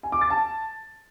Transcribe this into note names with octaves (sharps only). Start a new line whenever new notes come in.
G#5
D6
A6
A5